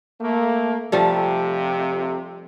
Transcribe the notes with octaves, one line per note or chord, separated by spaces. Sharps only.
A3 A#3
F2 C3 F3 G3 A3